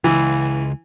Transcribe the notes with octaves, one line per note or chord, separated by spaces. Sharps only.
C#2 E3